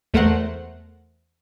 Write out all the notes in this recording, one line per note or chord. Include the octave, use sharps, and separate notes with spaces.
E2 A3 A#4 C5 F#5 F#6